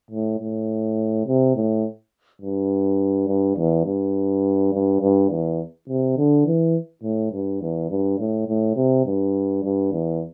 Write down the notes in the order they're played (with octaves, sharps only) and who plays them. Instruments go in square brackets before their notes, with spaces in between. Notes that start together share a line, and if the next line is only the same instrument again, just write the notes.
[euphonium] A2
A2
C3
A2
G2
G2
E2
G2
G2
G2
E2
C3
D3
E3
A2
G2
E2
G2
A2
A2
C3
G2
G2
E2